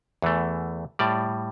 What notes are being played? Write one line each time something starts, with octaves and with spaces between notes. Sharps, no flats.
E2 E3 A3
A2 G3 D5